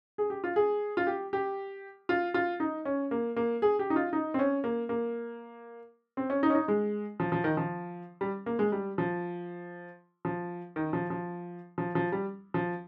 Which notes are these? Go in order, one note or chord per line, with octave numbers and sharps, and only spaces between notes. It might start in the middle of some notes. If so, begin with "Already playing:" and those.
G#4
G4
F4
G#4
F4
G4
G4
F4
F4
D#4
C#4
A#3
A#3
G#4
G4
D#4
F4
D#4
C4
C#4
A#3
A#3
C4
C#4
D#4
C#4
D#4
G#3
F3
F3
D#3
F3
G3
A#3
G#3
G3
F3
F3
D#3
F3
F3
F3
F3
G3
F3